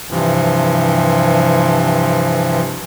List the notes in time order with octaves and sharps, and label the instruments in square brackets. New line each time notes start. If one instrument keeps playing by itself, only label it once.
[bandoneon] G2 C3 E3 F3